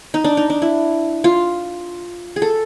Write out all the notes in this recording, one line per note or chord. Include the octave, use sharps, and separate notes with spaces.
D#4
D4
D#4
D4
E4
F4
G#4
A4